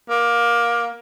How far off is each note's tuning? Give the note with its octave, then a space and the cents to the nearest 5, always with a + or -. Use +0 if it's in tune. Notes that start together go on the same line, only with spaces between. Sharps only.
A#3 +20